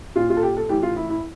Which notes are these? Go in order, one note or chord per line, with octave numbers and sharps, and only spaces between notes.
A#2 F4
F4
A4
G4
A4
A2 E3 G4
F4
E4
E4